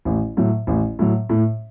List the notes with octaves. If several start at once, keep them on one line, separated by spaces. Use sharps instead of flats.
A1
A2 F#3
A1
A2 F#3
A2